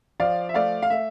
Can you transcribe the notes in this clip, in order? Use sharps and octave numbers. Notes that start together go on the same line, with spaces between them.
F3 D5 F5
E5
A3 D5 F5
F5
A3 E5